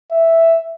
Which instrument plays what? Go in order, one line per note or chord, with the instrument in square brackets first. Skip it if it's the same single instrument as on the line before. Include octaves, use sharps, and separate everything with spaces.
[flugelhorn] E5